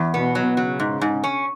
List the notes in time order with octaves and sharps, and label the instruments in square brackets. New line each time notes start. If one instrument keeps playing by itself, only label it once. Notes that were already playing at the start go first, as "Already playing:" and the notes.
Already playing: [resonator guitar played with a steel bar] E2
[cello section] B2 [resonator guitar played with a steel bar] B3
[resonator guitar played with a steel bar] F#3
[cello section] C#3 [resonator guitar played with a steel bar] F#3
[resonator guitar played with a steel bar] G#2
G#2
C#4